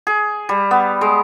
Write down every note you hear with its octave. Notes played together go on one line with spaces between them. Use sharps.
G#4
G3
B3
G#3